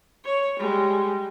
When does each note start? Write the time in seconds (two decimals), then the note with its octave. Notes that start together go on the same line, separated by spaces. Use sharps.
0.25 C#5
0.59 G3 G#3